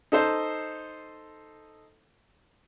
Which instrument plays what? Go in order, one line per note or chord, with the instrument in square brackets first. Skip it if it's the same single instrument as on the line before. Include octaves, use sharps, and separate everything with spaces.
[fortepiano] D#4 A4 C5